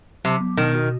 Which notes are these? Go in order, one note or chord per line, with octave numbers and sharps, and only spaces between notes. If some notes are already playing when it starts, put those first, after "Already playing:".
C3 F#3
B3
B2 D#3
F#4